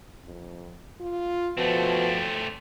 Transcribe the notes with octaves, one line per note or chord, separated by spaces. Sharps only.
F2
F4
B2 F3 A3 C4